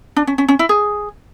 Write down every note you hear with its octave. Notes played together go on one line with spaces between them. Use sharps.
D4
C#4
C#4
C#4
E4
G#4